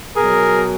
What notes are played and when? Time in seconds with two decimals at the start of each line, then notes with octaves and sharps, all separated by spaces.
0.16 B2 F#3 G#4 A#4